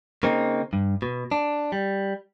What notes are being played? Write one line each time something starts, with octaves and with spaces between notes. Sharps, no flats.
C#3 A#3 C4 D#4
G2
B2
D4
G3